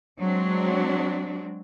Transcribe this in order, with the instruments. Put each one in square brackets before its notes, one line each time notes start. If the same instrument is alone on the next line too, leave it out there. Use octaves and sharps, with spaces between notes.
[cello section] F#3 G#3 C4 D4